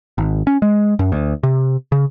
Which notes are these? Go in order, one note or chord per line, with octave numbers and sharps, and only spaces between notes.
G#1
C#4
G#3
F#2
D2
C3
C#3